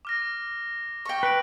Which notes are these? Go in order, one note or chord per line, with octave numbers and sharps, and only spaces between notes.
D6 F6 A#6
G5 C#6
B4 D7 F#7